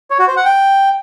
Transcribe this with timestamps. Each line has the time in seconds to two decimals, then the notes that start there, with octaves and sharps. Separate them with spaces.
0.10 C#5
0.19 F#4
0.28 C5
0.36 F#5
0.45 G5